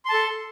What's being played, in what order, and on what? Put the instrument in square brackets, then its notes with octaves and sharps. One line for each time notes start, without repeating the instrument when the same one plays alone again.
[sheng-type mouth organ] C6
A5
A4